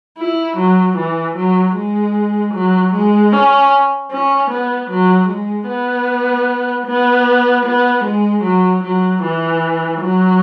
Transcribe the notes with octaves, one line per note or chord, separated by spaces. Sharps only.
E4
F#3
E3
F#3
G#3
F#3
G#3
C#4
C#4
B3
F#3
G#3
B3
B3
B3
G#3
F#3
F#3
E3
F#3